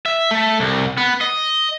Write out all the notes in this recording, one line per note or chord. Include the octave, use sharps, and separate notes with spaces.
E5
A3
C2
B3
D#5